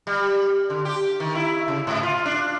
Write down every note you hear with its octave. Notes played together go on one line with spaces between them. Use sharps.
G3
D3
G4
D#3
E4
C#3
G#2
F4
D4